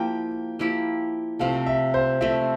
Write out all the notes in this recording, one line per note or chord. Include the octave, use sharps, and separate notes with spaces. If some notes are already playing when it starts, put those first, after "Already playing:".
Already playing: F3 A#3 E4 G4 G5
F3 A#3 E4 G4
C3 F3 A3 F5
E5
C5
C3 F3 A3 E5